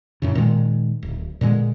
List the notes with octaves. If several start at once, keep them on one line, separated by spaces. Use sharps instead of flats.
F#2 A2 C#3
A#2 D#3 G#3
D1
A#2 D3 G3 G#3